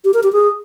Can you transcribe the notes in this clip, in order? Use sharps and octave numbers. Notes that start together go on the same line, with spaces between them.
G4
A#4
G4
G#4